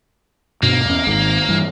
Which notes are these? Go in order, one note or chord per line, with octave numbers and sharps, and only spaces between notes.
G2 B2 A#3
E2 C#4
G#1 G#2
G2 E3